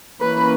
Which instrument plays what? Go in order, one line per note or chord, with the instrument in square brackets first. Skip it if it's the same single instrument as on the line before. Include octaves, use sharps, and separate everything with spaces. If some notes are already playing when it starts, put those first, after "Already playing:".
[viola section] E3 A#3 C#4 B4